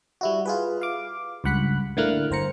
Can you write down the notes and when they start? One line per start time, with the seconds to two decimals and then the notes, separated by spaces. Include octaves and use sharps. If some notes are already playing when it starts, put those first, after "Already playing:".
0.21 G3 E4 F#4
0.46 F4 G#4 B4
0.81 F5 D6
1.44 C#2 G2 F#5 B5 F#6
1.97 A2 D3 A#3 E4 F6 F#6
2.31 G1 C5 A#5 C#7